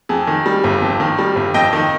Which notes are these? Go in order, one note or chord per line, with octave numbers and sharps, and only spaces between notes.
F2 G#4
D#3
G3
G1
F2
D#3
G3
G1
F2 D#5 G5
D#3